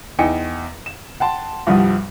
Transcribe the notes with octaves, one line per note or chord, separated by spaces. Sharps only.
E2 D#4 G5 G#5 C#7
E7
F#5 G5 A5 C6
C2 G2 F3 G3 F#4 D#6